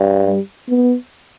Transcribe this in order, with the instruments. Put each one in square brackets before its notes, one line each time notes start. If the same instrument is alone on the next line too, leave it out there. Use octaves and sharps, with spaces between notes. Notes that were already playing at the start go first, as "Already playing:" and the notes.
Already playing: [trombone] G2
[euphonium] G3
B3